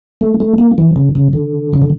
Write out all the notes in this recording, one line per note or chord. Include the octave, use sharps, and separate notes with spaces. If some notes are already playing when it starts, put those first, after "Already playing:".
A3
A3
A#3
E3
C#3
C#3
D3
C#3
D3